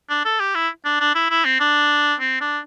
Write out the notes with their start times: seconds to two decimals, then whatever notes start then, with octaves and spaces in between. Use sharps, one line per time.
0.10 D4
0.25 A4
0.40 G4
0.55 E4
0.85 D4
1.00 D4
1.15 E4
1.30 E4
1.45 C4
1.60 D4
2.20 C4
2.41 D4